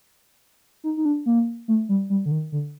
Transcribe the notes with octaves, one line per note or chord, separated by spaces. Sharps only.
D#4
D#4
D4
A#3
A3
G3
G3
D3
D#3
D3